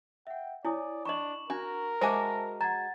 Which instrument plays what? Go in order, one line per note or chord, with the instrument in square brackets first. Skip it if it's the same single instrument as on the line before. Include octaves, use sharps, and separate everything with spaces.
[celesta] E5 F#5 [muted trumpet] G5
[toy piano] E4 [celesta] C#5 G#5 D#6 [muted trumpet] D5
[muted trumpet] D4 [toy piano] D#5 B5 [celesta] C#6 E7 F#7
[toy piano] D4 [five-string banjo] F#4 [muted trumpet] A#4
[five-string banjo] G#3 F#4 G#5 [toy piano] G#4 C5 [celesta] E5 A5 A#6
[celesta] F#5 G#6 A6 [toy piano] A#5